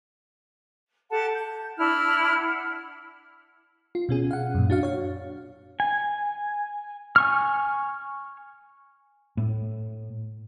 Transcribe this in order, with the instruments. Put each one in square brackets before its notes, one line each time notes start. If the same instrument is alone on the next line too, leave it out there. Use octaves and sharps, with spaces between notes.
[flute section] G4 A4 F#5 A5
G6
D4 E4 F6
F#5
[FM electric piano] F4
B2 C#4 G#4
F5 F#5
F#2 A#2
D4 F#4 F5
C#5 F5
[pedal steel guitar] G#5
G#5 C#6 F6
[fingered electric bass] A2